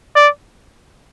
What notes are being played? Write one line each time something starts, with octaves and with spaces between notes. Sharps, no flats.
D5